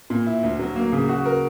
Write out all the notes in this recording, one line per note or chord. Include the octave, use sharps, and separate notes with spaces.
A#2
E4
D2
F#3
A#3
C#3
F#4
A#4